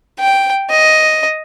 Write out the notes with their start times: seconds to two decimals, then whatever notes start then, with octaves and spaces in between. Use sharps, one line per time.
0.20 G5
0.71 D#5